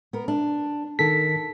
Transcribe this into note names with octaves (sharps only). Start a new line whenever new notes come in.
B3 A#4
D4
D#3 A4 B6